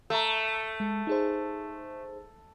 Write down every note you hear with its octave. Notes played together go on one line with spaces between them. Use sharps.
A3 E5 A#5
G#3
D#4 G#4 C5